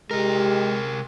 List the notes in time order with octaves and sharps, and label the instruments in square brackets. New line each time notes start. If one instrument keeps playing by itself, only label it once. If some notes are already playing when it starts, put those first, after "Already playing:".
[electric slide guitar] C3 A#4 [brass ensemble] G#3 G4